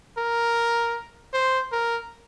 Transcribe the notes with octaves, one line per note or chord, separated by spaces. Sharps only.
A#4
C5
A#4